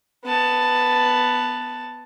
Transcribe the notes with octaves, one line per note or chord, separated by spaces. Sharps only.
B3 A5